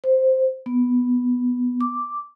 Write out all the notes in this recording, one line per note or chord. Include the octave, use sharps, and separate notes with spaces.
C5
B3
D6